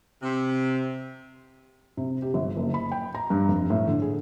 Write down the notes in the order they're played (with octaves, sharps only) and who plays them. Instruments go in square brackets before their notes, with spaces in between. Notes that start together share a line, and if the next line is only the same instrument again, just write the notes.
[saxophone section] C3
[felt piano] C3
G4
G1
F#1
B5
G5
A#5
G2
F1
A2
D3
G#4